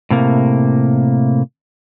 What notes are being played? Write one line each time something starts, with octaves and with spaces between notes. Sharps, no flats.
A2 C3 A#3